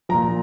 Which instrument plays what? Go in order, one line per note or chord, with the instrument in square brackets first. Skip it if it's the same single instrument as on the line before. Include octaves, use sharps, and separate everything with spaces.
[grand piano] A#2 F3 A#5